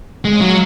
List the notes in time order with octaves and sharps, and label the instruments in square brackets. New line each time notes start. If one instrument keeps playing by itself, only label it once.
[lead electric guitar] G#3 [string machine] C#5 F5
[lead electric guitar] F#3